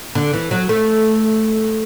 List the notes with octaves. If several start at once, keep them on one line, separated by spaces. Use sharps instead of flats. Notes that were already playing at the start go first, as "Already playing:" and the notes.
D3
E3
F#3
A3